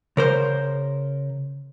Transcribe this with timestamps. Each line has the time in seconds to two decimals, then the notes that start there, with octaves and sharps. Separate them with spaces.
0.17 C#3 A#4 C5